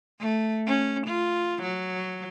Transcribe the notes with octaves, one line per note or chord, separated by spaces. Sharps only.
A3
C#4
F4
F#3